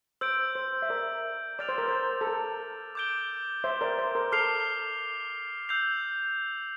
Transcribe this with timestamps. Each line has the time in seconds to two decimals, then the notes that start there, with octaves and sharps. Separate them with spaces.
0.21 C5 E6 G6 D7
0.55 C5
0.82 E5
0.89 A#4 D5
1.59 D5 D6 F6 A6 D7 F7
1.69 C5
1.78 A#4
1.88 C5
2.21 A4
2.27 A#4
2.95 D6 G6 D7 G7
3.64 C5 E5
3.81 A#4 D5
3.99 C5
4.15 A#4
4.32 A4 D6 F6 C7 F7
5.69 E6 G6 C7 F7